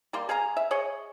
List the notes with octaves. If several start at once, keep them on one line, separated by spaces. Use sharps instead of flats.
G3 A#3 C6
G#4 F5 G#5 A#5
E5
G#4 C#5 D#5